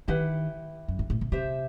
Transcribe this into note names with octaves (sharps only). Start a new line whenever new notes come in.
D#3 E4 G4 B4 F#5
F#2
G2
A2
B2
C3 G4 C5 E5